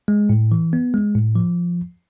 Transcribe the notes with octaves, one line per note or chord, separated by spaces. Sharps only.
G#3
A2
E3
B3
G#3
A2
F3